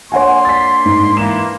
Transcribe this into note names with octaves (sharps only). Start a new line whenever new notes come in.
A#3 D4 C#5 F#5 G#5 C6
A6 B6
G#2
E3 A#3 E7